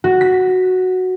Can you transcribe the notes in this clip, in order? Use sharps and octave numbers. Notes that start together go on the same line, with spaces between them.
F#4
B6